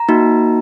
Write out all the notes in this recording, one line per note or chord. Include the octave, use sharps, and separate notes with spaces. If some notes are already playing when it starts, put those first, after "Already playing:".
Already playing: A#5
A#3 D#4 F#4